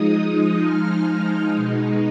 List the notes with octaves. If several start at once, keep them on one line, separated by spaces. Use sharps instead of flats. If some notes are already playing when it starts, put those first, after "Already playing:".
Already playing: F3 G#3 D#4 D#6
F3 G#3 D#4 F6
B2 G#3 D#4